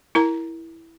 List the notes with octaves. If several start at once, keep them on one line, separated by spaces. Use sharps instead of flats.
E4 A#4 A#5